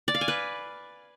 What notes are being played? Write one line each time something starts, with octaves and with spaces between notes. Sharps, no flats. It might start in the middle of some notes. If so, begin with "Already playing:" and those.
D5
F5
G#5
B4